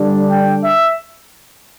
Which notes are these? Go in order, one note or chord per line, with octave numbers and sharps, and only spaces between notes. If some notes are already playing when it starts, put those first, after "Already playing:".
Already playing: D3 G3 D4
G5
E5